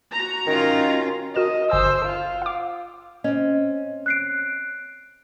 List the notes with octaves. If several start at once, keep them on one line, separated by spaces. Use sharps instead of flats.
F#4 A#5
D#3 C#4 F4
F#4 A#4 D#5 E7
G1 C5 G#5 D#6 E6
F4
F5 D6
C4 C#4 D#5
F#6 C7 D7